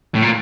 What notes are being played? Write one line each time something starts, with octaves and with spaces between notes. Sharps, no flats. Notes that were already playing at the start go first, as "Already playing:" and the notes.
A2
A#2